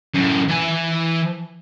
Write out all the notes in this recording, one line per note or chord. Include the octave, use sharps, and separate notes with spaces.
F#2 A2
E3 G#5